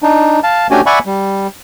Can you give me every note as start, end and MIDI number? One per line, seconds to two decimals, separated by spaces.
0.03 0.40 62
0.03 0.40 63
0.43 0.67 77
0.43 0.67 81
0.71 0.81 57
0.71 0.81 61
0.71 0.81 62
0.71 0.81 66
0.71 0.81 67
0.71 0.81 80
0.86 0.99 74
0.86 0.99 76
0.86 0.99 78
0.86 0.99 80
0.86 0.99 83
0.86 0.99 85
1.06 1.47 55